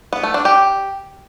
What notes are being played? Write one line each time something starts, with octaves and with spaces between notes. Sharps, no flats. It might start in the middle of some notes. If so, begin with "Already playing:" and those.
B3
A3
D4
G4